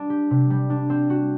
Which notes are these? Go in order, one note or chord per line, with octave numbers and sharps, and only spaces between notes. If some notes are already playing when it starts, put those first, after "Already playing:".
Already playing: G3 D4
G4
C3
G3
D4
C4
F#4